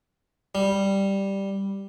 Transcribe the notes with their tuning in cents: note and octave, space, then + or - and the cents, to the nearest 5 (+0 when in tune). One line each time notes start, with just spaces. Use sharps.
G3 +0